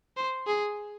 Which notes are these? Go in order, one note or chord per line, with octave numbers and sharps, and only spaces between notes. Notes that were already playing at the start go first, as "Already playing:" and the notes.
C5
G#4